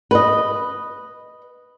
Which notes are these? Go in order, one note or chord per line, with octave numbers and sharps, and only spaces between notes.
B4 D#5